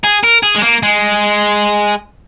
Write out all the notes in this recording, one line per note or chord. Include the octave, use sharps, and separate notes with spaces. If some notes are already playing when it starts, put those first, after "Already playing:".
G#4
A#4
G#4
G#3
A#3
G#3